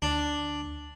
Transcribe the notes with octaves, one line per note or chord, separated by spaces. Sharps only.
D2 D4